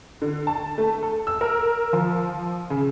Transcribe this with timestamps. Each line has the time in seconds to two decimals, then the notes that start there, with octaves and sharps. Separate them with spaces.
0.22 D3
0.47 A5
0.78 A3
1.03 A4
1.27 E6
1.41 A#4
1.93 F3
2.70 C#3